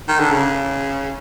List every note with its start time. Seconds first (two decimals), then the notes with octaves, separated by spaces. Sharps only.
0.08 D#3
0.20 D3
0.31 C#3